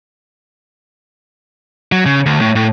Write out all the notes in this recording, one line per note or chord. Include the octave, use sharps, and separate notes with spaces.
F#3
C#3
D2
A2
A2